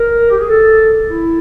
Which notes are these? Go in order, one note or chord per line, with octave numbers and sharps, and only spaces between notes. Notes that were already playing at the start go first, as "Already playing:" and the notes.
Already playing: A#4
G4
G#4
A4
E4